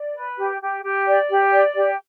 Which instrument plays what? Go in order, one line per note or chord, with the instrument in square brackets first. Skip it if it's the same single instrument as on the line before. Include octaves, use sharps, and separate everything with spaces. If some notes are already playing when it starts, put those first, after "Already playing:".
Already playing: [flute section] D5
B4
G4
G4
G4
D5
G4
D5
G4